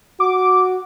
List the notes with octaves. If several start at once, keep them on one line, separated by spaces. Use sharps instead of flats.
F#4 D6